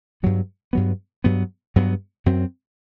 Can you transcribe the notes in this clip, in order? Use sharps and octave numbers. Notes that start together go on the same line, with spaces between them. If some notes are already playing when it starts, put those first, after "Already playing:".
G2 F#3 B3
G2 F#3 B3
G2 F#3 B3
G2 F#3 B3
F#2 F#3 C4